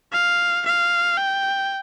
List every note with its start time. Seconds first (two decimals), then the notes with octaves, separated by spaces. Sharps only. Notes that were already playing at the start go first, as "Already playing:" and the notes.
0.13 F5
0.66 F5
1.18 G5